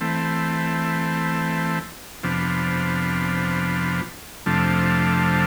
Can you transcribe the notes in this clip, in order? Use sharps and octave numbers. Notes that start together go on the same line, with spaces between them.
E3 A3 C4
F2 C3 F3 B3 D4
F2 C3 F3 A3 D4